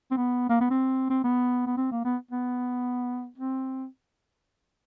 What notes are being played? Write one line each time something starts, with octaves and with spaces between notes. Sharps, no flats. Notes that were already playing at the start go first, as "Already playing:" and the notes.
C4
B3
A#3
B3
C4
C4
B3
B3
C4
A#3
B3
B3
C4